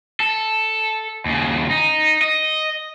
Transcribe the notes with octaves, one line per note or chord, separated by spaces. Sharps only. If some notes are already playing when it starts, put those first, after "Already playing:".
A4
D#2 C#3
D#4
D#5